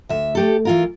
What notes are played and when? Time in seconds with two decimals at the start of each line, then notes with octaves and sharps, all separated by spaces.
0.09 D2 E5
0.35 A3 G4 A4
0.65 E3 F4 A#4